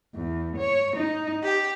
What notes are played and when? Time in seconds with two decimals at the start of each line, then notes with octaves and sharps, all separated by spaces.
0.15 E2
0.56 C#5
0.97 D#4
1.44 G4